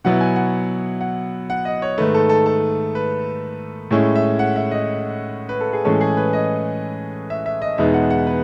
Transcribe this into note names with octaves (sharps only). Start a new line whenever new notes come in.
B2 F#3 B3 E4 F#5
G#5
F#5
F#5
F#5
D#5
C#5
G#2 D#3 A3 B4
A4
A4
A4
B4
A2 G#3 C#4 E4
E5
F#5
E5
D#5
B4
A4
G#4
A2 E3 G#3 C#4 A4
G#4
B4
D#5
E5
E5
D#5
E2 B2 G#3 B3 D#4 E5
F#5
F#5
B4